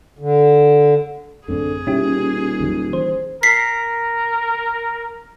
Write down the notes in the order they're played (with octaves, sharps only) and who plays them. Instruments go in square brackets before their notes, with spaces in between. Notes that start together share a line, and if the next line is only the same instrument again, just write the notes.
[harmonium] D3
[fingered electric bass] A1 F#2 C4 [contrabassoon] D3 [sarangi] G#4
[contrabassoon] D#1 [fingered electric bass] B2 [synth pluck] C#4 E4 G4
[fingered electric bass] E2 D#3 F#3
[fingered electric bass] E3 [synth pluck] C5
[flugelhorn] A#4 [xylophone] B6 C7